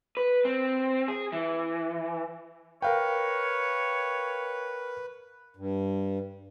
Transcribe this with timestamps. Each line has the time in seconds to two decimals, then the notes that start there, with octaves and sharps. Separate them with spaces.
0.17 B4
0.45 C4
1.08 G#4
1.32 E3
2.82 A#4 B4 C#5 F5 G5
5.57 G2